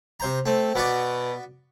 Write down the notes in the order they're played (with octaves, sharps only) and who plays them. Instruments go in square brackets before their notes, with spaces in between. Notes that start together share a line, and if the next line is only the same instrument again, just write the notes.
[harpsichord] C3 C5 A#5
[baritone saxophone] A3 [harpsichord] C4
[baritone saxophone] B2 [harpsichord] B3 F#4 D5